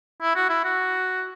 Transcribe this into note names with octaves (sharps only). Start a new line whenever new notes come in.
E4
F#4
E4
F#4